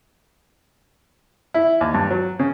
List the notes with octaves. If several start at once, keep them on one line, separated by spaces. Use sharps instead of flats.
E4
D#2
G2
F#3
C#3